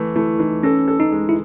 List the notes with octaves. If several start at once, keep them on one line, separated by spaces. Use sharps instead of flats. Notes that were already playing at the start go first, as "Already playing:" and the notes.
Already playing: E3 A3
A3 E4
E3 D#4
C#4 A4
A4
D#4
G#3
E4